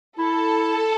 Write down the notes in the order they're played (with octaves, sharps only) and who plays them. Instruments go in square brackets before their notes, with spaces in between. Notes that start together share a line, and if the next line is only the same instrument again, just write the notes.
[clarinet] E4 [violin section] A4